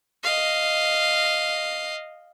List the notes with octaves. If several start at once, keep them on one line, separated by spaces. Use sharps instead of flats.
D#5 F5